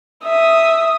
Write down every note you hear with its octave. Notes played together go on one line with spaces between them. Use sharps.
E5 D#6